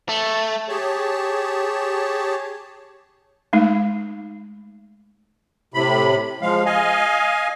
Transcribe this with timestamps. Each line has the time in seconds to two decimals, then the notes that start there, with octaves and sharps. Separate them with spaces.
0.09 A3
0.69 G4 G#4 C#5 A5
3.53 G#3 A3 D#4
5.74 A2 C3 B5
6.42 F3 G#3 F5
6.65 D#5 F5 G#5